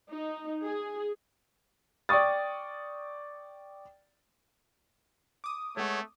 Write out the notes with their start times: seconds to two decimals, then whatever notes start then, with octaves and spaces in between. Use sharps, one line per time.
0.11 D#4
0.65 G#4
2.09 D5 G5 C#6 D#6 A6
5.44 D6 D#6
5.77 G#3 A3 B3 C#5